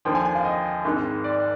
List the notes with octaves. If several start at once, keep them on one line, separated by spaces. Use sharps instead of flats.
D#2 D3 F3 G5
G#5
G#5
F5
D#5
G#1 G#2 D#3
D5